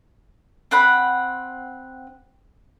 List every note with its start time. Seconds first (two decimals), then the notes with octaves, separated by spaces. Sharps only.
0.71 C4 F#5 B5